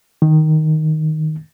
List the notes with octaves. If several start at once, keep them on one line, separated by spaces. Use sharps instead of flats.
D#3